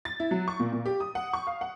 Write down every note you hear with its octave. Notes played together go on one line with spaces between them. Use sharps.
A6
E4
F#3
C#6
A#2
A#2
G4
D#6
F#5
C#6
F5
F#5